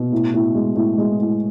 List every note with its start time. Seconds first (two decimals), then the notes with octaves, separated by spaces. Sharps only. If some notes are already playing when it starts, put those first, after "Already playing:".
Already playing: B2
0.12 A2
0.34 A2
0.55 G#3
0.76 A2
0.98 G#3
1.20 A2